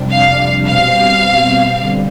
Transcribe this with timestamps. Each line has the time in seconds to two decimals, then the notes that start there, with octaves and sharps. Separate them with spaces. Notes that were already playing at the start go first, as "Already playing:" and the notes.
Already playing: F2 C3 G3 D4
0.10 F5
0.66 B2 G3 C4 F5
1.79 D3 G3